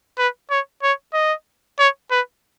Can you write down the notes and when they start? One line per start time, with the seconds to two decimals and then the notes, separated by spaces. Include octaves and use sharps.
0.18 B4
0.50 C#5
0.83 C#5
1.14 D#5
1.79 C#5
2.11 B4